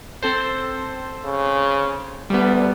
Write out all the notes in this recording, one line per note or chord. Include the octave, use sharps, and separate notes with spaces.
C4 A4 C5
C#3
D2 G3 B3